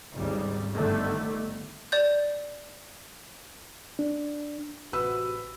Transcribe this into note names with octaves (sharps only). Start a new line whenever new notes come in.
G#1 D2 C#3 G3
G1 D3 D#3 A3
D5 G6
D4
A1 C3 F#4 B4 E6